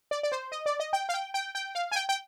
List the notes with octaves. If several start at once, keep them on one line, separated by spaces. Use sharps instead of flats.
D5
D5
C5
D#5
D5
D#5
G5
F5
G5
G5
G5
F5
G#5
G5
G5